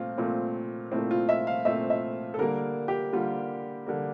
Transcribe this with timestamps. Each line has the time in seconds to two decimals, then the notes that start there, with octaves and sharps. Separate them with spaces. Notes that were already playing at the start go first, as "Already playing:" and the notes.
Already playing: A#2 A3 C4 F4
0.18 A#2 A3 C4
0.92 A#2 A3 C4 E4
1.11 F4
1.29 E5
1.47 F5
1.65 A#2 A3 C4 E5
1.90 E5
2.34 A4
2.39 D3 G3 A#3 A#4
2.88 G4
3.13 D3 G3 A#3 F4
3.86 D3 G3 A#3